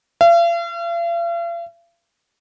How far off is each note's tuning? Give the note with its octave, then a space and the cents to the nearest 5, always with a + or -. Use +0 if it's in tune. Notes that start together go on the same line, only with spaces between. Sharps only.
F5 -45